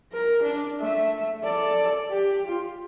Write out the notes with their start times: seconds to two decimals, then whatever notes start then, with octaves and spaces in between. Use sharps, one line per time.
0.13 A#4
0.43 D4
0.80 A3 E5
1.44 A4 D5
2.10 G4
2.47 F4